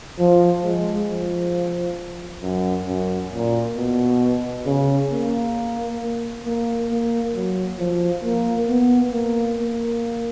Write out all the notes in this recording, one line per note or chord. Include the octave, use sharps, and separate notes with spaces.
F3
G#3
F3
F#2
F#2
A#2
B2
C#3
A#3
A#3
A#3
F#3
F3
A#3
B3
A#3
A#3